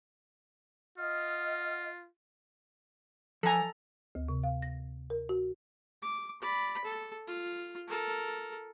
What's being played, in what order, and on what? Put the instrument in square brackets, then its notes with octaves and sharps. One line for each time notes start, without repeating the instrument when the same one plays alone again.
[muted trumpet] F4 [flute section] D#5 F#5 F6
[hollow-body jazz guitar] F3 G#5 [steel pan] A4 A#5
[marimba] D2
C3
F5
A#6
A#4
F#4
[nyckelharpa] D6
D5 B5
A4
F4
A4 A#4